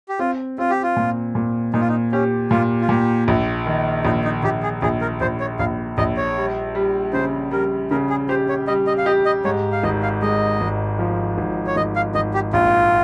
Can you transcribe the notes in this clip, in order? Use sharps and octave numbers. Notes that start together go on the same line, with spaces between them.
G4
C4 F4
C4 F4
G4
F4
A#2
A#2
A#2 D#4
F4
D#4
C#4 G4
A#2 F4
F4
A#2 G4
A#1
D#3
A#1 D#4
D#4
A#1 G4
G#4
A#1 G#4
A#4
A#1 C5
C#5
A#1 F5
A#1 D#5
C#5
G3
G3
C#3 C5
G3 A#4
C#3 A#4
G#4
G4 C5
C#5
G3 D#5
D#5
F5
G4 D#5
D#5
G#2 C#5
F5
G#1 D#5
F5
G#3 D#5
G#1
F3
G#1
C#5
G#1 D#5
F5
G#1 D#5
G4
A#1 F4